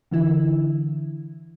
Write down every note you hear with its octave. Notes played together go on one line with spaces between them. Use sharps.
D3 E3 E4